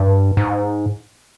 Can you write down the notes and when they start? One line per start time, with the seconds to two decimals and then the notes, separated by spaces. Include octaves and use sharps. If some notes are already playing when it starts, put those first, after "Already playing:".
Already playing: G2
0.37 G#2